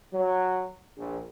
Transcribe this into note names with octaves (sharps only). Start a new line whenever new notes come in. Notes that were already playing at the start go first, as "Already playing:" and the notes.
F#3
A#1